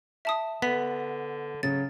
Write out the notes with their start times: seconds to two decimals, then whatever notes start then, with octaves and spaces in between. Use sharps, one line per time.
0.25 E5 A5 D#6
0.62 D3 B3 B6
1.63 C#3 F#3 A6